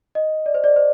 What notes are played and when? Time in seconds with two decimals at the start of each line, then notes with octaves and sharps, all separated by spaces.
0.15 D#5
0.46 D5
0.54 C5
0.64 D5
0.76 C5